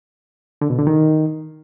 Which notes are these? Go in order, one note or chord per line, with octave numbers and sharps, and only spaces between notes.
D3
B2
D3
D#3